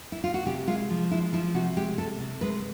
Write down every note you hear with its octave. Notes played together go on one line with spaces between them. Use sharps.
E4
F4
F#4
C3 G4
G#3 F4
F3
G#3 E4
F3 E4
C3 F#4
G#3 G4
C3 A4
C3
G#3 B4